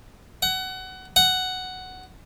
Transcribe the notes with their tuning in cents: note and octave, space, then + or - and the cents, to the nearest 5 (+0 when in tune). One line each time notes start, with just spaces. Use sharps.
F#5 +25
F#5 +10